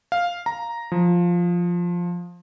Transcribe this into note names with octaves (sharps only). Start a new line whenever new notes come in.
F5
A#5
F3